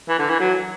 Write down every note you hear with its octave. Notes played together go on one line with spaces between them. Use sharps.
E3
D3
E3
F#3